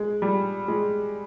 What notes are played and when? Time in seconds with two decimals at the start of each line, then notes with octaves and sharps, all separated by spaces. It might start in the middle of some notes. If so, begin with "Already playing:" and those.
Already playing: G#3
0.22 G3
0.68 G#3